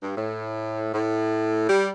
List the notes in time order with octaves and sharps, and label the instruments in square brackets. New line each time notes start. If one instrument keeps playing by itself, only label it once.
[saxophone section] G2
A2
A2
G3